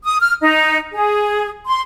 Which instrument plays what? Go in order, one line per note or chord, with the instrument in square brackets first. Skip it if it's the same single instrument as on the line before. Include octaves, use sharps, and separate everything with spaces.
[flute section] D#6
F6
D#4
G#4
C6